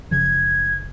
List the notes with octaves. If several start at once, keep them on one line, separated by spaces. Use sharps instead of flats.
F#1 C#3 F3 G#6